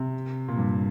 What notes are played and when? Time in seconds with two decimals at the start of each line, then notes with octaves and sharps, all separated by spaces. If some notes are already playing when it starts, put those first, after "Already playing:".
Already playing: C3
0.48 A#2
0.57 G2